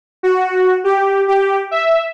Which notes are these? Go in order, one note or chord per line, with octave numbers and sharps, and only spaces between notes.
F#4
G4
G4
E5